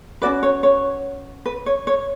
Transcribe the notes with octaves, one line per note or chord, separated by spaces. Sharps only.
C#4 F#4 B4 D5
C#5
C#5
B4
C#5
C#5